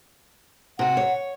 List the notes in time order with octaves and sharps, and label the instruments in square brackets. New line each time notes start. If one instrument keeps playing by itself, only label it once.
[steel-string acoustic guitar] C3 F#4 [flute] F#5
[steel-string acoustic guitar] C#5